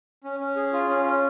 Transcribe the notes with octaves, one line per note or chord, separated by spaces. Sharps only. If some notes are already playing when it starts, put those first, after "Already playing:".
C#4
C#4
G#4
F4
C#4
C#4